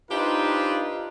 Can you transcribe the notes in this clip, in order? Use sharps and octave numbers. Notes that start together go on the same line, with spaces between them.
D4 D#4 F4 G4 B4 C5